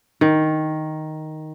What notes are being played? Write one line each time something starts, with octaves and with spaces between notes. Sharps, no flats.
D#3